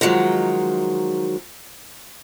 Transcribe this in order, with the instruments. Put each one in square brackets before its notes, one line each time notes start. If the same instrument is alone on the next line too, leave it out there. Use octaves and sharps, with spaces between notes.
[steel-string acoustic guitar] D#3 F3 F#3 G#3